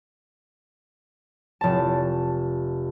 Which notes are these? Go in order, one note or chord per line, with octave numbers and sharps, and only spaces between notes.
F1 A5